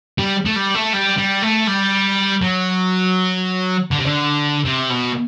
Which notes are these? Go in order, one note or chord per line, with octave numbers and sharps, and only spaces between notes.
G3
A3
G3
A3
G3
G3
A3
G3
F#3
D3
C3
D3
C3
B2